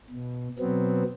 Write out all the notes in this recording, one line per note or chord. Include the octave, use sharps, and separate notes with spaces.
B2
B2 F#3 B3 C4